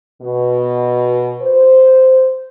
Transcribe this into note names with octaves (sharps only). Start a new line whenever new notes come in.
B2
C5